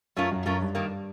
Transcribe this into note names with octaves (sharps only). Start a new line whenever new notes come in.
F#2 A3 C#4 F4 A#4
F#2
F#2 A3 C#4 F4 A#4
G2
D#3 G3 A#3